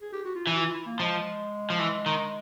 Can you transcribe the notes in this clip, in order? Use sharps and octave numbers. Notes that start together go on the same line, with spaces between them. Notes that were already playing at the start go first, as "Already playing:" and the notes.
G#4
G4
F#4
F4
E3 E4
F#4
F4
E4
A#3
F3 G#3
F3
E3
D#3